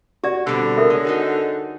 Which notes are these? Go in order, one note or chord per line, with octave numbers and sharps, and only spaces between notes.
F#4 G4 D5
B2 D3 G3 C4
A4 A#4 E5
G#3 A4 C#5
D#4 F#4 G#4